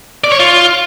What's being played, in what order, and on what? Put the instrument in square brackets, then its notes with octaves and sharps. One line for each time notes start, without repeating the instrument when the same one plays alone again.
[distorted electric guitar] D5
C#5
F4